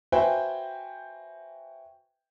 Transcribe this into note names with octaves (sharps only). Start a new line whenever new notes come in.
F#4 B4 C5 E5 G5 G#5